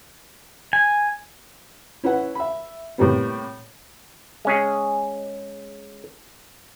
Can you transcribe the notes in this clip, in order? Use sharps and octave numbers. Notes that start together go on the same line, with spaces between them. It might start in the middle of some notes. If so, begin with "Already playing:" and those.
G#5
C#4 E4 B4 F#5
E5 B5
A2 C3 G3 A#3 B3
G#3 C#4 G#4